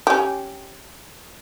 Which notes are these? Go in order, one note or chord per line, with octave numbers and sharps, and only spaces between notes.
C#4 G4